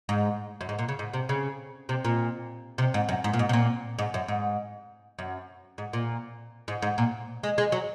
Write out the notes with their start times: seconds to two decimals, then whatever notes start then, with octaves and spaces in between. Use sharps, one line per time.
0.09 G#2
0.61 F#2
0.69 G#2
0.79 A#2
0.89 C#3
0.99 G#2
1.13 C3
1.29 C#3
1.89 C3
2.04 A#2
2.78 C3
2.94 G#2
3.09 F#2
3.24 G#2
3.33 A#2
3.39 G#2
3.49 C3
3.53 A#2
3.99 G#2
4.14 F#2
4.28 G#2
5.19 F#2
5.78 G#2
5.93 A#2
6.68 G#2
6.82 G#2
6.98 A#2
7.43 G#3
7.58 G#3
7.72 F#3